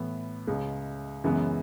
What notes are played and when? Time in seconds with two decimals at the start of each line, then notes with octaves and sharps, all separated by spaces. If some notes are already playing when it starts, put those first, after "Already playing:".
Already playing: A2 E3 B3
0.47 C#2 C#3 G#3
1.24 F#2 C#3 E3 G#3 B3